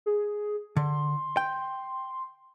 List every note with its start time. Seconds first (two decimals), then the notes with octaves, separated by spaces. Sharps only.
0.06 G#4
0.76 D3 C6
1.37 G5